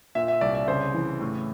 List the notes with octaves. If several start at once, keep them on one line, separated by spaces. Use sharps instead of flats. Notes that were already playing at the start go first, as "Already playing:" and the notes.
A#2 E5
E5
C2 D5
E5
C#3 C5
E3
A2